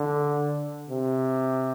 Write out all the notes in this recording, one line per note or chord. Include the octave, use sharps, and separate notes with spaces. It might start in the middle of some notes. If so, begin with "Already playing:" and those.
Already playing: D3
C3